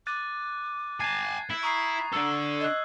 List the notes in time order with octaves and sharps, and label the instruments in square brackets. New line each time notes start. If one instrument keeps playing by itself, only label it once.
[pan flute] D6 [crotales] F#6 A6 D#7
[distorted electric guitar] G#5 A5 [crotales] G#6 A6 C7
[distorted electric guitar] E4
[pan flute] A#5 [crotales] C#6 D#6 C7
[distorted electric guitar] D4 A4 [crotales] E6
[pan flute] D#5 [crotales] F#6 G#6